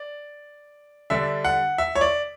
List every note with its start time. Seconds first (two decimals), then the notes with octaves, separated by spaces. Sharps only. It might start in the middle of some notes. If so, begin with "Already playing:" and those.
Already playing: D5
1.10 D3 G3 D4 E5
1.44 F#5
1.78 E5
1.95 C#5
2.01 D5